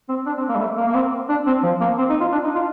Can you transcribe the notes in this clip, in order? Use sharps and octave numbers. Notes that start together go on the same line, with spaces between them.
C4
D4
C4
A#3
G3
A3
A#3
A#3
C4
D4
C4
F3
A#3
C4
D#4
F4
D4
D#4
F4